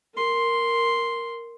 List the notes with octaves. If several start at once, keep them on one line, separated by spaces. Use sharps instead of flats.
A#4 C6